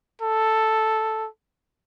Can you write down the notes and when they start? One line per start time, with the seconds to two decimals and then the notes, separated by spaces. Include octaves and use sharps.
0.22 A4